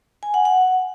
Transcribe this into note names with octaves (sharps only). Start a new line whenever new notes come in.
G#5
F#5
F#5